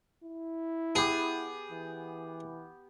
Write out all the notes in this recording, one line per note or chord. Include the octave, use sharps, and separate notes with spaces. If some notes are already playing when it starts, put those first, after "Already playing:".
E4
B3 G4 G#4
E3